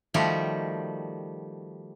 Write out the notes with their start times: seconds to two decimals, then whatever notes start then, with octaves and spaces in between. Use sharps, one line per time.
0.14 D#3 F3 G3 A3 F#4 G4